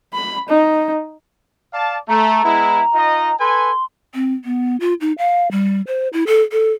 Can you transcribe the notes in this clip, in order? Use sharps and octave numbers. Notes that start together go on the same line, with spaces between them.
B5
D#4
D5 F5 A5
A3 A#5
G#3 B3 E4
D#4 F4 D#5
A4 B4 G#5 C6
C4
B3
F4
D#4
F5
G3
C5
E4
A4
A4